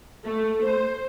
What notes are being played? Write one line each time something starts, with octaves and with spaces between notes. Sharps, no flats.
A3
C5